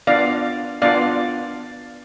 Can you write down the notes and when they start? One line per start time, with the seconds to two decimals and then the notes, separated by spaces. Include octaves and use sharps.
0.07 B3 D4 F4 D5 F5
0.82 B3 D4 F4 D5 F5